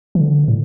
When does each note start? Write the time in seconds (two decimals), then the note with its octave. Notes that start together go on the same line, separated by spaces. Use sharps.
0.15 E3
0.21 D3
0.48 A2